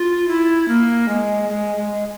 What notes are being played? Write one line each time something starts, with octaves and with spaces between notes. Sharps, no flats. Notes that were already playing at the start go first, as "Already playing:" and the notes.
Already playing: F4
E4
A#3
G#3
G#3
G#3